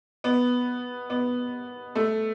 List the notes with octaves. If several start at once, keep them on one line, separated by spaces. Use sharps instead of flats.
B3
B3
A3